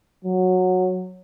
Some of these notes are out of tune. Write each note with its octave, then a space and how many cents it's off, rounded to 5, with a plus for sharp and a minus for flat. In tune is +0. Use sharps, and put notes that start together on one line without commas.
F#3 -10